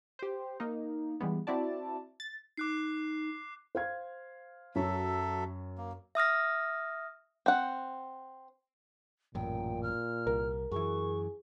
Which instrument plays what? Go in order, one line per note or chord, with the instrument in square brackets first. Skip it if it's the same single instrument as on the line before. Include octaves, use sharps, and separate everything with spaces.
[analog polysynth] G4 C5
A#3 D#4
E3 G3 G#3 B3
C4 E4 F#4 D5 A5
A6
[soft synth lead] D#4 [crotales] D6 F#6 C7
[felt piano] C5 F5 G#6
[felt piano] F#2 C#5 [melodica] F#3 A4 E5
[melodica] A#3
[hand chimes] E5 D#6 F6 A#6
[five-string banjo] C4 F#5
[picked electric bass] A1 F#2 [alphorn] A#2 [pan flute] G5
[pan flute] F6
[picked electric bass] C2 [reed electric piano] A#4
[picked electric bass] F#2 E3 [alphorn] G#4 [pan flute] C#6